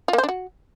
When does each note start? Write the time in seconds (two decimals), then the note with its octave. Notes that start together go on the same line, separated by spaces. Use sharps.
0.08 F4
0.13 A#3
0.18 C5
0.23 D4
0.29 F#4